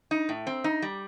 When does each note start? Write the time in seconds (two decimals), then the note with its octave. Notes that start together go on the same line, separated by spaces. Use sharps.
0.11 D#4
0.29 A2
0.47 C4
0.64 D#4
0.82 G3